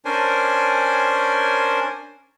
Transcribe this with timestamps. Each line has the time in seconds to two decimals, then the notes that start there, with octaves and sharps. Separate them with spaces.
0.05 C#4 D4 A#4 C5 G#5